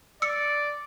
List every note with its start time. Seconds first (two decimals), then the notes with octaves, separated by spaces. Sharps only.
0.22 D5 E6 C#7